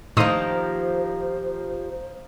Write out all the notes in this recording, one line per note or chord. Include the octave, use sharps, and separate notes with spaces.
A2 D#3 F3 A#3 G4 C5 C6 D#6